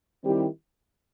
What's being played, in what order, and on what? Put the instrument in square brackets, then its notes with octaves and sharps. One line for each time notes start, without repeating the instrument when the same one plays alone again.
[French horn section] D#3 G3 C4 E4 G4